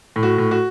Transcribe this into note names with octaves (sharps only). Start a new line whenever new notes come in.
A2
F#4
A2
F#4